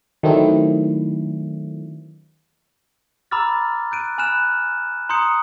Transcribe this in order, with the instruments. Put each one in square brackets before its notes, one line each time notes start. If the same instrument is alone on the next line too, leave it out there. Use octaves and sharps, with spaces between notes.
[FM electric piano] D#3 F#3 A3 C4 D4 E4
[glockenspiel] A#5 B5 D6 E6 F6 A6
F#6 G6 D7 D#7
G#5 B5 F6 F#6 E7
A#5 C6 D#6 G6 C#7